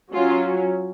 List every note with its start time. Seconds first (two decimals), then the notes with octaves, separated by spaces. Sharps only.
0.13 F#3 C#4 F4